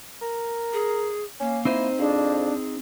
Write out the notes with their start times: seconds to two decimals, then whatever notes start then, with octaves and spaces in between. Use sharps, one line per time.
0.21 A#4
0.73 G#4
1.40 A#3 C#4
1.65 C4 D#4 E4 C5
1.99 F2 D4 G#4